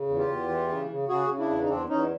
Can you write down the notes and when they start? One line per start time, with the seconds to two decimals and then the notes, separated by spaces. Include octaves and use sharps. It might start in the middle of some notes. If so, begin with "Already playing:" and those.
Already playing: C#3
0.09 E2
0.18 F4 G4
0.28 E2
0.49 E3
0.68 C#3
0.90 C#3
1.08 C#3 F#4 G#4
1.29 C#3
1.39 D4 E4
1.49 E2
1.63 D#4
1.69 E2 C4 D4
1.89 E2 C#4 D#4